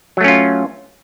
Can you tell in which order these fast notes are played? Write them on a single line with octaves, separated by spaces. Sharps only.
F#3 A3 C#4 F4